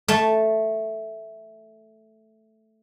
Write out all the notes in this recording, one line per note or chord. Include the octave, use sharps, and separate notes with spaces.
A3 A5